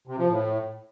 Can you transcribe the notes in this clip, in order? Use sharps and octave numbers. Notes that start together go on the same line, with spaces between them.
C3
F3
A2